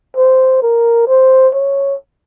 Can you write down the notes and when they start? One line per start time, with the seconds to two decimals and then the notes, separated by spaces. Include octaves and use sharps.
0.17 C5
0.63 A#4
1.08 C5
1.54 C#5